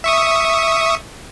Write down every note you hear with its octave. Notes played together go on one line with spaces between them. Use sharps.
E5 C#6 D#6